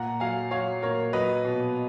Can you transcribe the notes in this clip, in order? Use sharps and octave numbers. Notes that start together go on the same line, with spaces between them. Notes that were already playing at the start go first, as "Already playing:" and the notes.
Already playing: A#2 F#5 A#5
F#3 F5 G#5
F#3 C#5 F5
A#2 A#4 C#5
F#3 B4 D#5
B2